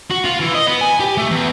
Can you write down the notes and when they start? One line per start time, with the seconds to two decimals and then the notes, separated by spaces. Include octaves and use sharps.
0.11 F#4
0.25 F4
0.40 E3
0.55 D#5
0.67 B3
0.81 G#5
1.00 G4
1.17 A3
1.30 E2